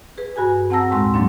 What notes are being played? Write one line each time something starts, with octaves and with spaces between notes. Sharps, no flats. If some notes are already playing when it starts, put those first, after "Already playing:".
G#4 B4
G2 F#4 G#4 G#5
C4 F#5 A5 A#5 E6 A#6
D#2 A2 G#3 C6 E6
G#2 F3 F#3 A#3 D4